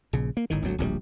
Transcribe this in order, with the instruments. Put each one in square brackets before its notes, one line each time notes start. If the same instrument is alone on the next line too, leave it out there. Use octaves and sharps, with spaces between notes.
[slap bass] A#1 C#3
A#3
G1 A2 D#3
G#1 D2 F#3
D1 A#1 A2 G3